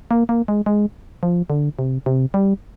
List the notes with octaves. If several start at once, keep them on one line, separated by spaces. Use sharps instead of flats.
A#3
A#3
G#3
G#3
F3
D3
C3
C3
G3